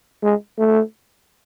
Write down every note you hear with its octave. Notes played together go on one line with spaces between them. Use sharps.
G#3
A3